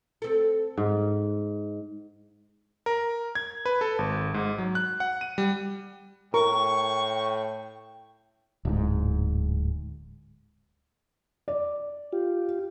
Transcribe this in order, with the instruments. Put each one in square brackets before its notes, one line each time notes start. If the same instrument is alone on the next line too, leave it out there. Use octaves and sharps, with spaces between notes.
[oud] C4 A4
[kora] G#2
[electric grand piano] A#4
G#6
B4
A4
G#1
G#2
F#3
F#6
F#5
D#7
G3
[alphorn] A2 [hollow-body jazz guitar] A#4 [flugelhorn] G5 [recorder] C#6
[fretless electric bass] D1 G#2
[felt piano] D5
[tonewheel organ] F4 G4